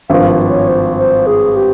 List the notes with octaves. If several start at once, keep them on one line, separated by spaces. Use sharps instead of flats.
G#1 G2 F3 F5
C#5
C5
C5
G#4
G4